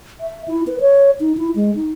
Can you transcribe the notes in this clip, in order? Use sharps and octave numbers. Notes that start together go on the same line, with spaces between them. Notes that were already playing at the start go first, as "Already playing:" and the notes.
E5
E4
B4
C#5
D#4
E4
G#3
D#4